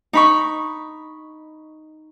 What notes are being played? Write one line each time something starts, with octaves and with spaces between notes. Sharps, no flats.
D#4 B5 C#6